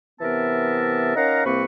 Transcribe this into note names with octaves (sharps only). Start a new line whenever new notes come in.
C3 E3 B3 A#4 E5 A5
C#4 D#4 A#4 F5 F#5 A#5
C2 C3 A#3 C4 B4 C#6